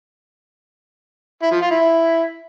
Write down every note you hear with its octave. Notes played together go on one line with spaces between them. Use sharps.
E4
F3
F4
E4